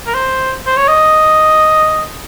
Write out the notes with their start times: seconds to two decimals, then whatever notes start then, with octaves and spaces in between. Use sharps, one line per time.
0.07 A#4
0.14 C5
0.66 C5
0.77 C#5
0.88 D#5